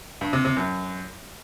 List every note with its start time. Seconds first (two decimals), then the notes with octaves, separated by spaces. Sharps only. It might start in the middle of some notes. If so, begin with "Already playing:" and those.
0.21 G2
0.33 C3
0.45 C3
0.57 F#2